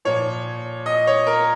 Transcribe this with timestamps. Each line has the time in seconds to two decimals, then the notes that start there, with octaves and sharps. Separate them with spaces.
0.05 A#2 F3 C#5
0.86 D#5
1.07 C#5
1.27 A#4